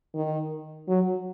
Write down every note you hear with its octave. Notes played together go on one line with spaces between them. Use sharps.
D#3
F#3